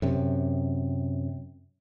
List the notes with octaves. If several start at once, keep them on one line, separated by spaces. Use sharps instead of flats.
F#2 C3